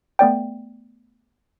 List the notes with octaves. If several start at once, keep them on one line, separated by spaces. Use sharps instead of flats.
A3 B3 D5 G5